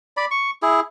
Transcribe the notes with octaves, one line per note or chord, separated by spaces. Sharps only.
D5 B5
C#6
E4 G#4